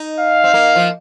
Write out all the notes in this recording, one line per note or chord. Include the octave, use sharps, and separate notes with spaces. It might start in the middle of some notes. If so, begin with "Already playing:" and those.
Already playing: D#4
F5
C4
A#3
F3